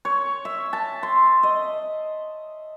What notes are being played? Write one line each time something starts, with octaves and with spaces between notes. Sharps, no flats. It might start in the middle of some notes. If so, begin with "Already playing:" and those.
C#5
E5
A5
C6
D#5